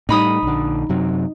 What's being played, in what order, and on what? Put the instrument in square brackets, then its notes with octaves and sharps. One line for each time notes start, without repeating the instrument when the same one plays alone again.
[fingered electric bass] A2 G3 [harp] D#4 B5 D#6
[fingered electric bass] A#1 D3
F#2 C3 F#3